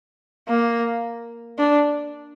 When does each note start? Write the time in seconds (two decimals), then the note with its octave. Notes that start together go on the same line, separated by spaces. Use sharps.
0.48 A#3
1.58 D4